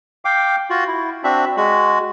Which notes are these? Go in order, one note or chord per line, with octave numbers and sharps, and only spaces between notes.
F5 G5 D6
F4 F#4
E4
C4 D4 F#4 E5
G#3 F#4